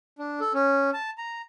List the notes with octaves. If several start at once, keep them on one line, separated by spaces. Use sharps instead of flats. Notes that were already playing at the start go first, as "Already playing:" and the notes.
D4
A4
C#4
A5
A#5